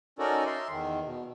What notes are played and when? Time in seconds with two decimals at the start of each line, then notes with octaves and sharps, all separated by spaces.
0.19 C#4 D#4 F#4 A4 A#4 D5
0.46 E5 C6
0.70 E2 D#3
1.05 B2